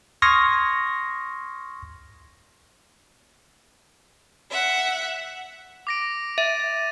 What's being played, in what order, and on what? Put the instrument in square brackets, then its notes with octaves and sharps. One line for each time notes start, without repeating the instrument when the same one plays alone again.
[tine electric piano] C6 C#6 D#6 F6 G#6 A#6
[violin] E5 F#5
[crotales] D6 A#6 D7
[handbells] E5 [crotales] A6 D#7